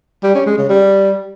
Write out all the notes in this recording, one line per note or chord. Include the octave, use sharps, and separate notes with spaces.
G3
C#4
G#3
C#3
G3